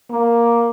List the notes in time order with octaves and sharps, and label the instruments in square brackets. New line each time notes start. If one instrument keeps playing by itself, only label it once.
[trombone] A#3